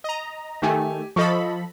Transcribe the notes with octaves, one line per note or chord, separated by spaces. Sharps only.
D#5 A#5
D#3 A3 G4 G#5
F3 A4 D#5 B5 C#6